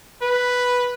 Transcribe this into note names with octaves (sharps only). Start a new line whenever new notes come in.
B4